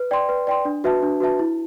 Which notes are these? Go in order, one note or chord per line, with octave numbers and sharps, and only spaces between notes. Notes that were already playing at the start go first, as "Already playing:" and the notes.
Already playing: B4
D5 G5 C6
B4
D5 G5 C6
D4
F#4 B4 E5 A5
D4
F#4 B4 E5 A5
E4